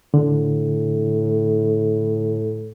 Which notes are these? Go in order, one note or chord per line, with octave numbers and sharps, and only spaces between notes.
A2 D3